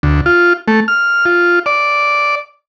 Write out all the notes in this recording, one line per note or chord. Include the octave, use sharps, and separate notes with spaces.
D2
F4
A3
F6
F4
D5